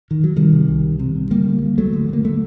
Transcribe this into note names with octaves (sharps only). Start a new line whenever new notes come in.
D#3
F#3
C3 D#3 G3
C3
C2
C2
C3
C3
D3 G3 A#3
D3
D2
D2 F#3 A3
D3
D3 A#3
D3 F#3 A3